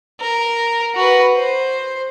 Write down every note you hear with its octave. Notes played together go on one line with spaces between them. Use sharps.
A#4
F#4 B4
C5